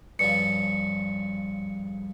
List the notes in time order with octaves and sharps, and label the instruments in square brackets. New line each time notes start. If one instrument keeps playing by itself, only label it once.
[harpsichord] G2 C#3 F3 [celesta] C#7